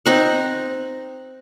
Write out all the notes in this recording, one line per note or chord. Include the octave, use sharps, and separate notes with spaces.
C4 D#4 F#5